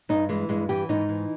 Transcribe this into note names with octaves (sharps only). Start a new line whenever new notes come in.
G2 D#4
E3 G#3
G2 G#3
E3 G4
G#2 D#4
E3